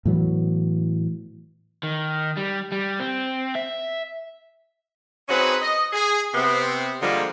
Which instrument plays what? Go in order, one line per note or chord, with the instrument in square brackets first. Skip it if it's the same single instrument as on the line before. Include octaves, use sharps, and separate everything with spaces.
[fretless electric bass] A2 E3 F#3 B3
[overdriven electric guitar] D#3
G3
G3
C4
E5
[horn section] C4 C#4 D#4 F#4 G#4 B4
D#5
G#4
C3 B3 C4
D3 F3 G3 G#3 A#3